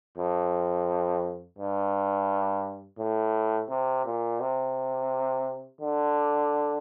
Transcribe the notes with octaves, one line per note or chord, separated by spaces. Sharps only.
F2
G2
A2
C3
A#2
C3
D3